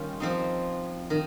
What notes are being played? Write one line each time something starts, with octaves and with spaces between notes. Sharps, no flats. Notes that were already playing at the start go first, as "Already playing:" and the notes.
Already playing: D#3 G3 C#4 F4
F3 C4 D#4
D#3